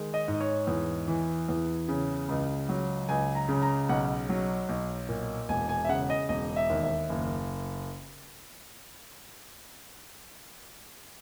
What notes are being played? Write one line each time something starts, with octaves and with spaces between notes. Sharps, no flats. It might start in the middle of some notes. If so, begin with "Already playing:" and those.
Already playing: D#3 G#3
D#5
G#2
C#5
E2
E3
E2
C#3
C#2
F#3
C#2 G#5
A#5
C#3
A#5
B1 F#5
F#3
B1
A#2
E1 G#5
G#5
E5
C#3 F#5
D#5
E1 D#5
E5
D#2
E5
F#1